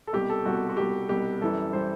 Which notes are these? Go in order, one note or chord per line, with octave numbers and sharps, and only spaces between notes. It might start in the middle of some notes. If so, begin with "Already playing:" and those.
A4
C2 B2 G3 G4
A4
C2 B2 G3 F#4
F#4
C2 B2 G3 G4
C2 B2 G3 G4
F#2 E3 G3 A4
E3 G3 C5